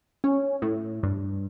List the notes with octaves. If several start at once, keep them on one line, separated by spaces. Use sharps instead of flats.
C#4
A2
G2